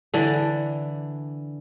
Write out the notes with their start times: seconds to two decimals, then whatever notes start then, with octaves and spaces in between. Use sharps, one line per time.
0.14 D3 E3 D4